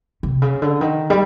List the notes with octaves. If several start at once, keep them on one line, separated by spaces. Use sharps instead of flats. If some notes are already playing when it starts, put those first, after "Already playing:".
C3
C#3
D3
D#3
G3